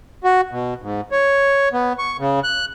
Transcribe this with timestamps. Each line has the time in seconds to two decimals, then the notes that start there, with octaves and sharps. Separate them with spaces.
0.24 F#4
0.51 B2
0.82 G#2
1.12 C#5
1.73 B3
1.99 C#6
2.19 C#3
2.44 F#6